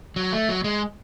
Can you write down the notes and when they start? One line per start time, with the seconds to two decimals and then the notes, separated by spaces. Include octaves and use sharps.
0.16 F#3
0.33 A3
0.49 F#3
0.64 G#3